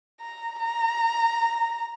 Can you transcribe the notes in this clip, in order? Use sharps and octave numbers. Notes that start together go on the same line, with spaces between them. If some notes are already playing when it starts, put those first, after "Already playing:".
A#5
A#5